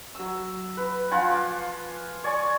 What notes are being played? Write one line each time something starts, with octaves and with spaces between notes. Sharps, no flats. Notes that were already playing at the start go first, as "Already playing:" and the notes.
F#3 E6
B4
F3 F4 F#5 G#5
D6
C#5 D5 G#5 C#6